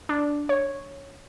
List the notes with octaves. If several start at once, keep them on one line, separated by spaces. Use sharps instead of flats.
D4
C#5